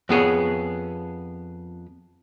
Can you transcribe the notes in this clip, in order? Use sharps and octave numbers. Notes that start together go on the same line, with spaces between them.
F2 B3 G#4 C#5